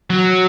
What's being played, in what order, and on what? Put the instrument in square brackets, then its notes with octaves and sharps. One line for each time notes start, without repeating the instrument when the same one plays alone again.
[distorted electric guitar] F#3